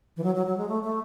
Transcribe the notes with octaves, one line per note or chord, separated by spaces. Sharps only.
E3
F#3
F#3
F#3
G#3
A3
A3